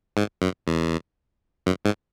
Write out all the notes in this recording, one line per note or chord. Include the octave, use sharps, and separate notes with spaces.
G#2
F#2
E2
F#2
G#2